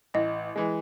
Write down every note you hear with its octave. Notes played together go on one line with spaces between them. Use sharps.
A1 D#5
E3 G#3